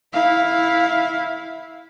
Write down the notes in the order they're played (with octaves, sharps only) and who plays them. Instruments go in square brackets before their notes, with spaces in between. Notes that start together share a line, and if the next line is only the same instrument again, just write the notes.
[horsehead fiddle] E4 F5